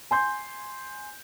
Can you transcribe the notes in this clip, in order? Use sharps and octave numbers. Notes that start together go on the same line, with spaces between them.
G#5 C6 G6